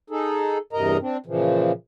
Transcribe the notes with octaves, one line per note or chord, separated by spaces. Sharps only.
D#4 G#4 A4
E2 G2 C3 A#4 D#5 A#5
C4 D4
A#2 C#3 E3 F3